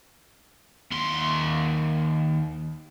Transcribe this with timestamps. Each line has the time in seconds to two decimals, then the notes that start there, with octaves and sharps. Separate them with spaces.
0.92 D#2 C6